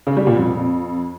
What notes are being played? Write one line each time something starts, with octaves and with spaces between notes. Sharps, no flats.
C#3
G3
A#2
F2